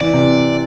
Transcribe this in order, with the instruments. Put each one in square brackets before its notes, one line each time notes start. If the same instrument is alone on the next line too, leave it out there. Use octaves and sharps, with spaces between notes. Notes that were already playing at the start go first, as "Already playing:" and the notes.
[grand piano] E3 [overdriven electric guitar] D5
[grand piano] C3